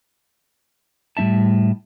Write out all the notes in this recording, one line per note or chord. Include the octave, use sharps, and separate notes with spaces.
A2 G3 C#4 E5 A5